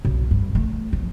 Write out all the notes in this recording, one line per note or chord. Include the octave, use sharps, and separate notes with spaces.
B1
G2
A3
F3